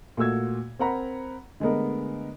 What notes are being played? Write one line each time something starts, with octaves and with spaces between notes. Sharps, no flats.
A#2 A3 F#4 E6 G#6
C4 A#4 F#5 A#5 B5
D3 G#3 A3 B3 A#4